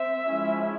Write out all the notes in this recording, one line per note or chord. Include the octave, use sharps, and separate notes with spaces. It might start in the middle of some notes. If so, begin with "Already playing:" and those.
Already playing: C4 E5
F3 G#3 C#4 E4